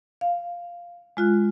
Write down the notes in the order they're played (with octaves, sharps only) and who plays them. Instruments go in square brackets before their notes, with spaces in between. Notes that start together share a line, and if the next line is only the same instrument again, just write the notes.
[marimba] F5
G#3 F4 F#6